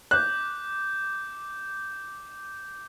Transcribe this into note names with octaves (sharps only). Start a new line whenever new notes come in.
D6 F#6 G6